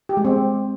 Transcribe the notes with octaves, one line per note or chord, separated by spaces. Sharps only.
G4
G#3
C4